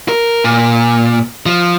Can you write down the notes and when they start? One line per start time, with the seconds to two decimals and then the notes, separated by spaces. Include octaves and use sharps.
0.09 A#4
0.44 A#2
1.46 F3